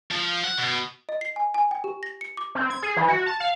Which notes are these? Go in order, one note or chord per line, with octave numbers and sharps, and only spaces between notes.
F3
F#5
B2
D#5
C7
G#5
G#5
G5
G4
A#6
C#7
D6
C4
G#6
G#4
E3
F#4
A5
F5